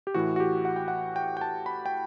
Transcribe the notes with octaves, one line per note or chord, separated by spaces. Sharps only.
G4
A2 E3 F#4
F#4
G4
F#5
G5
F#5
G5
G5
A5
B5
G5